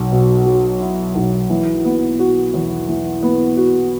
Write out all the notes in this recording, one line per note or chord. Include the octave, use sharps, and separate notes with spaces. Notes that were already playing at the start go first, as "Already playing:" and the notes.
Already playing: B1
B2
F#3
E4
B1
E3
B3
F#4
E2
E3
B3
F#4